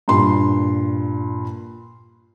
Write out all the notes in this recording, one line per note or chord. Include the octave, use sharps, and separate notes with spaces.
G2 A#2 C6